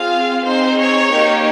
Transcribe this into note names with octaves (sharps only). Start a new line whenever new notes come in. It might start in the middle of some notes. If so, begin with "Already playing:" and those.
Already playing: C4 F4 G#4 F5
C4 D#4 G#4 C5
C#5
A#3 D#4 G4